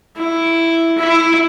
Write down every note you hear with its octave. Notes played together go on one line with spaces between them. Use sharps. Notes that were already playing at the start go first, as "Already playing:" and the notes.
E4
E4